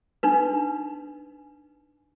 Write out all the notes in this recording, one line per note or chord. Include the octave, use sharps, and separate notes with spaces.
D4 D#4 B4